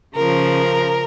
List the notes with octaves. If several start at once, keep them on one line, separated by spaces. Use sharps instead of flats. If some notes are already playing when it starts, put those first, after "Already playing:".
C#3 F3 A#4